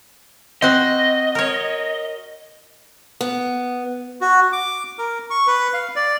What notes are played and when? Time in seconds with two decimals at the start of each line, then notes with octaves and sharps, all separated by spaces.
0.62 C4 F#4 D#5
1.35 A#4 C#5
3.21 B3
4.21 F#4
4.52 D6
4.98 A#4
5.30 C#6
5.47 B4
5.74 F5
5.96 D5